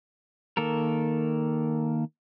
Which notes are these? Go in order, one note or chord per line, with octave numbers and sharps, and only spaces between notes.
D#3 A#3 A4 A#4